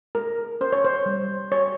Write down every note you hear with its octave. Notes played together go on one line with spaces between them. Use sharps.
G#3 A#4
C#4 C5
C#5
C5
G3
G4 C#5